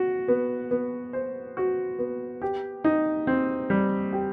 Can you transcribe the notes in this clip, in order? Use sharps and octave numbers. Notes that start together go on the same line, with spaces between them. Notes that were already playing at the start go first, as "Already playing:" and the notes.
Already playing: F#4
B3
B3
C5
F#4
B3
G4
D#4
C4
G3
G4